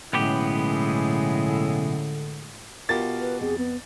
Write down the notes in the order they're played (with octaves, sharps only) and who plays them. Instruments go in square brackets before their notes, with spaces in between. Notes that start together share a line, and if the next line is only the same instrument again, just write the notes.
[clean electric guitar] B1 B3 G4 [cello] A2 G#3 [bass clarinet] D3 [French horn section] C#4 E4
[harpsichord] B2 G4 [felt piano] F4 A#4 [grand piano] A6
[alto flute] B4
[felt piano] F2 [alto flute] G#4
[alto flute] B3